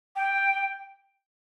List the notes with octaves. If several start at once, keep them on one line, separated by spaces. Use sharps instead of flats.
G5